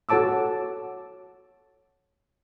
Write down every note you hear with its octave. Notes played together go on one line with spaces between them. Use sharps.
F#4 A4 C#5 A5 D6 E6